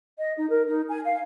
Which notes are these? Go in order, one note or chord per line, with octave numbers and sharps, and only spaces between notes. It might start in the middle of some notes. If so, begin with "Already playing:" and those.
D#5
D#4
A#4
D#4
G#5
F5